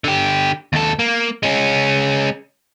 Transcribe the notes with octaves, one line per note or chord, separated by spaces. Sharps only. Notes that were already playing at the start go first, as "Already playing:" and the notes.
D3 G4
D#2 A4
A#3
G#3 C#4